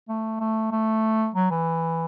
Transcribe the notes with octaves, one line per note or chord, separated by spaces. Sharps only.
A3
A3
A3
F#3
E3